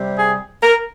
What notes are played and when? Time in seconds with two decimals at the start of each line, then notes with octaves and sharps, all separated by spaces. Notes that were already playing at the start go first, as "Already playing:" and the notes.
Already playing: C3 G3
0.19 G#4
0.62 A#4